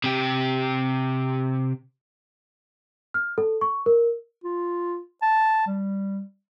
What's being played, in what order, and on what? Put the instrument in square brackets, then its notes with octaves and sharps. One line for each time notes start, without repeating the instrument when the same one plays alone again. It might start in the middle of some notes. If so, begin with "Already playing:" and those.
[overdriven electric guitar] C3 G4
[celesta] F6
A4
C#6
A#4
[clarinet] F4
A5
G3